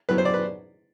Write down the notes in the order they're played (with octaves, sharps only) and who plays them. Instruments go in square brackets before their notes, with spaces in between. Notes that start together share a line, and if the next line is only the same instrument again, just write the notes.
[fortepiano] F#2 F#3 B3 B4
C5
D5
B4